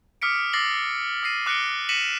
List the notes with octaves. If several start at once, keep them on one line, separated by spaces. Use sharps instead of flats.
D6 D#6 F6 B6 C#7 D7
D6 E6 A6 A#6 C7 F#7
D#6 A6 A#6 C7 D#7
D6 F#6 A#6 C#7 D7 G7
A#6 B6 C#7 D#7 E7 F#7